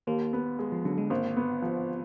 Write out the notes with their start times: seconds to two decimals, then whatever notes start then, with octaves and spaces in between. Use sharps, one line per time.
0.07 D#2 A#3
0.33 B3
0.59 G#3
0.72 F3
0.85 D3 F#3
0.98 G#3
1.10 G#1 A#3
1.37 B3
1.62 F3